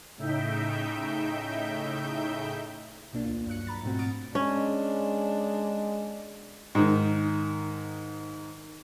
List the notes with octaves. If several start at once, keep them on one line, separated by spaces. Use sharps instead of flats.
A2 C#3 D#4 E5 G5 G6
B1 B2 A#3 D4
D2 D4 F4
G2 F#3 F#6 C#7
A#5 B5 A6
G#2 B2 F3 A3 C4 F#4
C#6 D#6 F6 A6 D7
G#3 C#4 D4
G#2 D#3